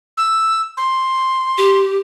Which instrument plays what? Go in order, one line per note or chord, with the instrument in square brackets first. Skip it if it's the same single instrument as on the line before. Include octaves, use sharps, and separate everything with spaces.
[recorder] E6
C6
[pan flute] G4